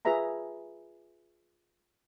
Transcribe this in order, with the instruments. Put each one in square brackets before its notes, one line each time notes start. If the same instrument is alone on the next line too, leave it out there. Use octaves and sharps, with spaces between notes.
[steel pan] F4 G#4 B4 E5 A#5 B5